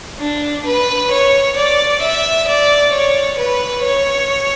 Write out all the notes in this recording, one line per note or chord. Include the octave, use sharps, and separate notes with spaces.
D4
B4
C#5
D5
E5
D5
C#5
B4
C#5